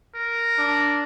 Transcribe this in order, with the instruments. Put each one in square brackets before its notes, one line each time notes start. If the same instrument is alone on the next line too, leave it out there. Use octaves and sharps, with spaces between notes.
[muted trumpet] A#4
[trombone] D4